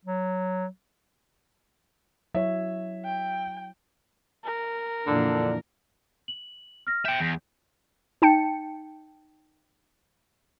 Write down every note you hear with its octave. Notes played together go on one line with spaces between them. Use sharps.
F#3
F#3 E4 C#5 E5
G5
A#4
F2 A#2 D3 E3 D4
F#7
F6 A#6
E5 G5 G6 D7
E2
D#4 G5 A5 C#7